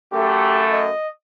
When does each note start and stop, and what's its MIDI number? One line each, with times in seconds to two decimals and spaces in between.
0.12 0.89 42
0.12 0.89 57
0.12 0.64 67
0.72 1.08 75